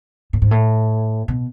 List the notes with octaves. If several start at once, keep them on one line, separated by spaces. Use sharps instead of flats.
A2
G#2
A2
B2